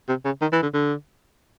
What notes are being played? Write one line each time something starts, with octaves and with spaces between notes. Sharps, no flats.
C3
C#3
D#3
E3
D3
D3